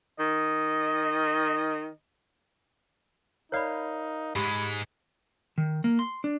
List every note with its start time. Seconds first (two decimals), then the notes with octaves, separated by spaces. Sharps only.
0.19 D#3 D#5
3.52 D#4 A#4 C#5 D5 F5 B5
4.36 G#2 G#3 G4 B5
5.58 D#3
5.84 A#3
5.99 C6
6.24 D4